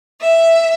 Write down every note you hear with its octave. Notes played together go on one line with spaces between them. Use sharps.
E5